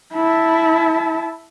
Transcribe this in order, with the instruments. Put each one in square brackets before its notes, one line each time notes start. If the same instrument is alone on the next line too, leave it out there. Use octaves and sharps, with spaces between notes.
[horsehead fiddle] E4 A5